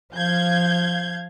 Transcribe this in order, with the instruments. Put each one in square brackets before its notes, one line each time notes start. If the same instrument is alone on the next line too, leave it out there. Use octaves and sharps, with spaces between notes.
[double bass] F3 [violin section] F5 G6 G#6